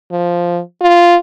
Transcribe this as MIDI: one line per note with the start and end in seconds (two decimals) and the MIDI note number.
0.12 0.61 53
0.82 1.16 65